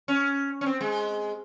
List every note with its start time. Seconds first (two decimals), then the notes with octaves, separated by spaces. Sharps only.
0.08 C#4
0.61 C#4
0.66 C4
0.81 G#3